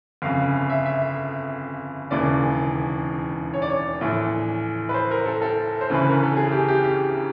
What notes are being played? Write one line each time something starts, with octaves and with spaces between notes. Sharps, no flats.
G1 F2 C#3 F5
E5
E5
E1 D#2 C#3 E3 D5
C#5
D5
C#5
A#1 A2 E3
B4
C5
A#4
A4
A4
C5
D2 C#3 E3 B4
A#4
A4
G#4
G4
G4
G4